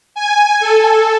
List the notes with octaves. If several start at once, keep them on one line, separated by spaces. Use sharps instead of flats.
G#5
A4